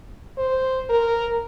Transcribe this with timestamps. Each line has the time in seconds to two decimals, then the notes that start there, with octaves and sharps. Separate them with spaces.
0.37 C5
0.89 A#4